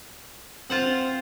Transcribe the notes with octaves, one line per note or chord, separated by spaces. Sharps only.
C4 F4 C5 F#5